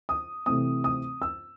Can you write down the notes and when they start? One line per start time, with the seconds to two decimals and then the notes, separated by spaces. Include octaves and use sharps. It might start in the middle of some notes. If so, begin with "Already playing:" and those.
0.09 D#6
0.46 C3 E3 A3 C4 D#6
0.84 D#6
1.22 E6